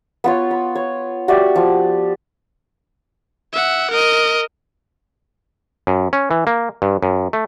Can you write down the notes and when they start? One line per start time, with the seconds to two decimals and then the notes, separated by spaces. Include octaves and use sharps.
0.24 B3 F4 C#5
0.51 B5
0.75 C#5
1.28 F#4 G4 D5 E5
1.56 F3
3.53 E5 F#5
3.90 A#4 D#5
5.87 F#2
6.13 C#4
6.31 E3
6.47 A#3
6.82 G2
7.03 F#2
7.33 A3